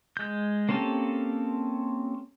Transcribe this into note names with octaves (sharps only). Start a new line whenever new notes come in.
G#3 G6
A#3 C4 C#4 G4 A4